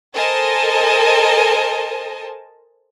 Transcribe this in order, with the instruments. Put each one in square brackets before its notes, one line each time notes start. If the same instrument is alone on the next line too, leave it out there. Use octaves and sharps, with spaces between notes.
[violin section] A4 A#4 C5 D#5 G#5 A5